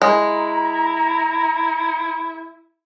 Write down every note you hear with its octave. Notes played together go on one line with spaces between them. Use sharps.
G#3 E4 A#5